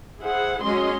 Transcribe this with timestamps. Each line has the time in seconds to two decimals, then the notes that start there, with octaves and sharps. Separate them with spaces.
0.20 E4 G#4 C5 F#5
0.62 F#3 G#3 C#4 D#5 C6